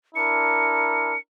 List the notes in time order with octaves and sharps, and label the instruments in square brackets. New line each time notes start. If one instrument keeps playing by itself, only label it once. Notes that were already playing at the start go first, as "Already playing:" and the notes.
[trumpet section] D4 E4 A#4 [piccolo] C#7